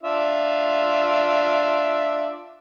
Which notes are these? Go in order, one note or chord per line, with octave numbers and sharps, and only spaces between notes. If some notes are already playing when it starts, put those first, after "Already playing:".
D4 F4 E5